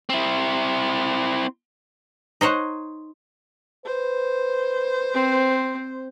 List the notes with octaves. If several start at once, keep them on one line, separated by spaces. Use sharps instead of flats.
C4 E4
D#4 C5 C#5 F#5
B4 C5
C4